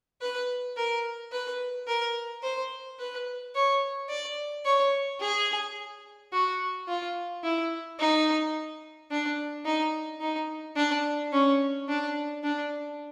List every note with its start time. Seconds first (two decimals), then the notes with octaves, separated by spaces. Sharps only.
0.21 B4
0.77 A#4
1.32 B4
1.87 A#4
2.43 C5
2.99 B4
3.55 C#5
4.09 D5
4.65 C#5
5.21 G#4
6.33 F#4
6.88 F4
7.44 E4
7.99 D#4
9.11 D4
9.65 D#4
10.21 D#4
10.76 D4
11.33 C#4
11.89 D4
12.43 D4